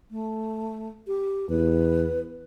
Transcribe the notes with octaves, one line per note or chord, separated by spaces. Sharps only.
A3
G4
E2 B4